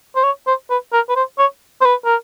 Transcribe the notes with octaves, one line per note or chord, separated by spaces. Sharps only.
C5
C#5
C5
B4
A#4
B4
C5
C#5
C5
B4
A#4